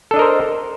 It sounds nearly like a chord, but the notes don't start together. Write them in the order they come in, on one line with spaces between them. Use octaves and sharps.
A4 D4 D#5 A#4 C5